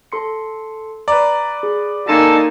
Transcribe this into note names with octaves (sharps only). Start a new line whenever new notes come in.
A4 C6 C#7
B4 D5 A#5
G#4
A#3 D#4 A4 G#5 A5 C6 A#6